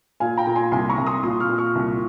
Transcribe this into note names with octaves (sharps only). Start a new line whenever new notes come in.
A#2 F5 G#5
G5 A#5
A#2
G#5 C6
C2 G#5 C6
A#5 C#6
C2
C6 D#6
A#2 C6 D#6
C#6 F6
A#2
C#6 F6
C2